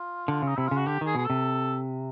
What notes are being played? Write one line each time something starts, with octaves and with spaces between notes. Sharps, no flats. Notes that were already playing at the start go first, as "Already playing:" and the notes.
Already playing: F4
D3
C#3
D#4
C3 E4
C#3 F4
F#4
D3 G4
D#3 G#4
B2 G#4
C3 A4